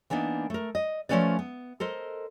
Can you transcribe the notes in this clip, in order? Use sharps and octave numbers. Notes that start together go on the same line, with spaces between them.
E3 A#3 B3 D4 D#4
A3 A#4
D#5
F3 G#3 A3 C#4 B4 D5
B3
A4 A#4 C5 D#5